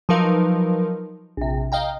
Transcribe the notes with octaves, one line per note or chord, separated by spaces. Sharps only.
F3 F#3 D#4 A#4 B4 F5
A#1 C3
D#5 F5 G5 A#5